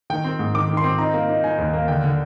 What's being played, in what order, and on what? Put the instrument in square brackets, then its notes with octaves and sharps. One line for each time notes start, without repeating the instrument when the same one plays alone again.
[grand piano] D#3 G5
C4
G#2
D#3 D6
D#3
C6
C4
D#4 A#5
A#3
D#4
D#4 G#5
D#2
A#3
D3 G5
D3